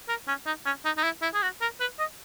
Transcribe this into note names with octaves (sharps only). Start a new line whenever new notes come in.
A#4
C#4
D#4
C#4
D#4
D#4
E4
E4
G#4
F#4
A#4
B4
D#5